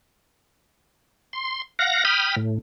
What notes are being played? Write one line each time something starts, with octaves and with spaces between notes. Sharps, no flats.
C6
F5 F#5 A#6
G5 B5 D#6 F6
A2